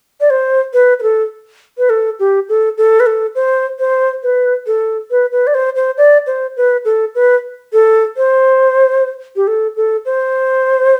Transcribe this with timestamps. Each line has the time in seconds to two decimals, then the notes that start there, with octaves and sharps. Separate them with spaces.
0.20 D5
0.30 C5
0.73 B4
0.99 B4
1.03 A4
1.78 B4
1.90 A4
2.19 G4
2.49 A4
2.78 A4
3.00 B4
3.06 A4
3.35 C5
3.79 C5
4.23 B4
4.67 A4
5.11 B4
5.32 B4
5.47 D5
5.54 C5
5.76 C5
5.98 D5
6.27 C5
6.57 B4
6.85 A4
7.15 B4
7.73 A4
8.17 C5
9.36 G4
9.47 A4
9.77 A4
10.05 C5